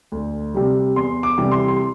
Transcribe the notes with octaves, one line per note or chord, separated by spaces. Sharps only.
D2
C3 G3
E2 C6
D6
C3 E3 G3
C6
C6